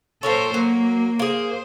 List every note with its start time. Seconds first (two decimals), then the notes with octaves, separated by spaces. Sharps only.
0.23 A#2 A4 A#4 C5 C#5
0.54 F#3 A#3
1.19 A#3 G#4 C5